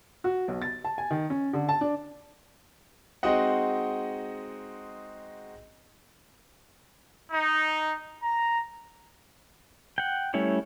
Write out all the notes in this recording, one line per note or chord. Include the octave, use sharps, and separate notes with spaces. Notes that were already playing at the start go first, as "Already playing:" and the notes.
F#4
B1
A6
A5
G#5
D#3
C#4
D3
A5
D4
G#3 C4 D#4 F#4 D#5 F#5
D#4
A#5
F#5 G5
G3 A3 C#4 E4 C#5